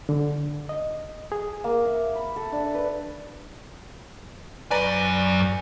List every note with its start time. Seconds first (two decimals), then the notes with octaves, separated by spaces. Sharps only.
0.09 D3
0.69 D#5
1.32 G#4
1.64 A#3
1.85 E5
2.15 B5
2.36 A4
2.52 D4
2.74 B4
4.71 F#2 B4 D5 G#5 A#5